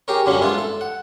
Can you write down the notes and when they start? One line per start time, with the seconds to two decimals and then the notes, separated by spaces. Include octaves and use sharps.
0.08 G4 G#4 A#4 C#5
0.26 F#2 D3 F#3 G3 A#3 C#4
0.41 G#2 B3 D4 E4 F4
0.58 A4
0.81 F#5